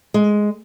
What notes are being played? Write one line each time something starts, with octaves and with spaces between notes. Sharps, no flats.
G#3